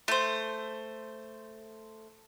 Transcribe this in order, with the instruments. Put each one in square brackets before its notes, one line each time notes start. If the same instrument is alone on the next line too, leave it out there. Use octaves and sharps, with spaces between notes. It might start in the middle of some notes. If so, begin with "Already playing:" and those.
[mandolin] A3 C5